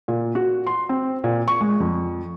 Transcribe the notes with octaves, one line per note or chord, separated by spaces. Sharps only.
A#2
F#4
C6
C4
A#2
C#6
G#3
F2